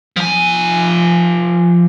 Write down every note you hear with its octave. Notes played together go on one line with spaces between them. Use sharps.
F3 G#5